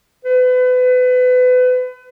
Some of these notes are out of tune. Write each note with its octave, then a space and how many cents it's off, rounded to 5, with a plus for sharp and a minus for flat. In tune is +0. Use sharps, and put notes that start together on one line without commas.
B4 +30